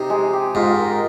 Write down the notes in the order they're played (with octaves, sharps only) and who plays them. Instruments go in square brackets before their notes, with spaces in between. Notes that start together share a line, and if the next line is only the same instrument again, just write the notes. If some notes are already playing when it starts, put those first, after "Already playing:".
Already playing: [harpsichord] C3 [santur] D#4
[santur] G#3
G4
[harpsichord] G#2 [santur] F4
[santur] A#4